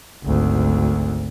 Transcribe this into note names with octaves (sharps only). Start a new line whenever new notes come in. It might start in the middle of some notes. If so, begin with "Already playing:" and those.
G#1 D2